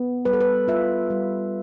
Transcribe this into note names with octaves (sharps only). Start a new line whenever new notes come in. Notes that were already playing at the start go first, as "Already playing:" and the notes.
Already playing: B3
G3 B4
A4
B4
F4 E5
G3